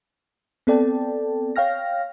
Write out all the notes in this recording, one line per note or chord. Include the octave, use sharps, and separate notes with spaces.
B3 C4 A4 D5 G5 A5
C#5 F5 G5 F6 A#6